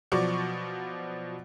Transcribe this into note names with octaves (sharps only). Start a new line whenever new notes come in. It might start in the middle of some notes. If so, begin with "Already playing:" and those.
B2 F3 F#3 D5 C#6